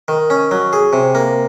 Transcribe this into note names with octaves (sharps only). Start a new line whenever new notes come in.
D#3
C#4
F#3
G#4
C3
A#3